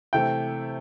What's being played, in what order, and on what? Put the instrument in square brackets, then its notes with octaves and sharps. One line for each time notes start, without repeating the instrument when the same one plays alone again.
[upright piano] C3 E3 A3 [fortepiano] G5